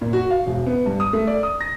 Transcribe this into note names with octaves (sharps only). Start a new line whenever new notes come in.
A#2
F#4
F5
E1
B3
G2
D#6
A3
D5
D#6
A#6